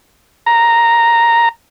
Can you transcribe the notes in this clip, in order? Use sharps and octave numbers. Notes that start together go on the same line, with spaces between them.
A#5